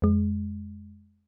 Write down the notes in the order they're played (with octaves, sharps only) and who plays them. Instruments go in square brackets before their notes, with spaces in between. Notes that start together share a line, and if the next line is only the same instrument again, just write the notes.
[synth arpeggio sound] F2 G#3